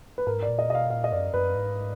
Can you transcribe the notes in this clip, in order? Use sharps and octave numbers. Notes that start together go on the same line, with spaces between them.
B4
G#2 A#4
D5
A#2
D#5
B2 D#5
F5
A#2 F5
D#5
F#2 D5
F#2 B4
G#2